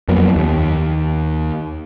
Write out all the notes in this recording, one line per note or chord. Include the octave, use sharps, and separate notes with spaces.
F2 F#3 A#3 B3
D#2